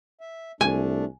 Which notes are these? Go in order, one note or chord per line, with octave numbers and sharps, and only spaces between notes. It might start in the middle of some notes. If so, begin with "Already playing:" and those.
E5
C2 A3 D4 G#5